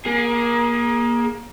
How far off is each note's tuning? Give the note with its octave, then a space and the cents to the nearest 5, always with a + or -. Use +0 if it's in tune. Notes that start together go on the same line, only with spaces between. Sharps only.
A#3 +25 G#4 +0